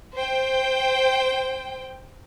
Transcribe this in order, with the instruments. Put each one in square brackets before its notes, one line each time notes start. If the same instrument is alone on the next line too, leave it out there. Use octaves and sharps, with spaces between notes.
[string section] C5 G5